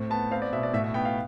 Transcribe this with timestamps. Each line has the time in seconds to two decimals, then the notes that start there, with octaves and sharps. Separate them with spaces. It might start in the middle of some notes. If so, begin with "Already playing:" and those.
Already playing: A2 C4
0.10 B3 A5
0.31 C4 F5
0.42 D5
0.52 B2 E5
0.63 D5
0.73 A2 E5
0.84 E5
0.94 B3 G5
1.05 F5